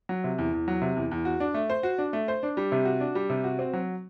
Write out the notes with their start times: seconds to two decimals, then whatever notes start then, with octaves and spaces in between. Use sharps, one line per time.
0.09 F#3
0.24 C3
0.38 E2
0.53 E2
0.68 F#3
0.82 C3
0.96 E2
1.11 E2
1.25 F#4
1.40 D4
1.54 A3
1.70 C5
1.83 F#4
1.98 D4
2.13 A3
2.28 C5
2.43 D4
2.57 G3
2.72 C3
2.85 F#4
3.00 D4
3.15 G3
3.30 C3
3.44 F#4
3.59 C4
3.73 F#3